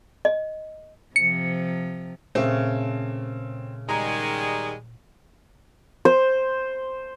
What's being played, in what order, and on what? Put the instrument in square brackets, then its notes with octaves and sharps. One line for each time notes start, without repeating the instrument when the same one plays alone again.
[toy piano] D#5
[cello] C3 F3 [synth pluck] C#7
[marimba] A#2 [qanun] C#3 A3 [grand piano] C4
[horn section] D#3 G3 G#3 [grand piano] A#5
[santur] C5